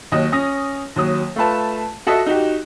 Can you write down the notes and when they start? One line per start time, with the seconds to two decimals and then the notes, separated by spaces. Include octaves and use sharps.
0.12 D#2 F#3 D#5
0.32 C#4 D#6 A#6
0.96 D#2 F#3 D#6
1.36 A3 F4 B4 A5
2.07 F#4 A4 D#5 E5
2.26 D#4 F#4 G4